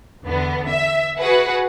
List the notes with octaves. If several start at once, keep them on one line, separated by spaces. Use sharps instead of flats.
E2 D3 B3
E5
F#4 G#4 B4 F#5